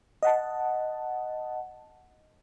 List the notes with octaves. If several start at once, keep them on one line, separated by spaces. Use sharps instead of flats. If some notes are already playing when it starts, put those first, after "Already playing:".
D#5 F#5 A5